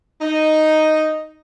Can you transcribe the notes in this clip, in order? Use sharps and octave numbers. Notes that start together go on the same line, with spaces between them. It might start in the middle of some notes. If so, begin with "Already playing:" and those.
D#4